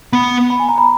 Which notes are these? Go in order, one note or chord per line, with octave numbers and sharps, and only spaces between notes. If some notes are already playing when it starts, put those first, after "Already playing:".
B3 B5
B5
G#5
A#5
B5